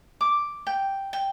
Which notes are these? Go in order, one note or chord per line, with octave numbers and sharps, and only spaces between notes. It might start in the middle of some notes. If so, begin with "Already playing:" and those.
D6
G5
G5